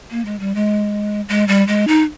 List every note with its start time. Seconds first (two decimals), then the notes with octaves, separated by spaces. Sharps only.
0.11 A#3
0.25 G#3
0.39 G3
0.55 G#3
1.29 G#3
1.48 G3
1.68 G#3
1.88 D#4